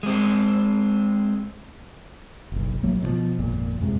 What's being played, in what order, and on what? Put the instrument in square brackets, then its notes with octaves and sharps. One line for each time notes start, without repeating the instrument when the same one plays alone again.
[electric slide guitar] G#3 C4
[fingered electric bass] F#1 B1
A#1 F#3 A3 A#3
B2 D#3 F3
G#1 F2 A#2
F2 G#2 C3 G#3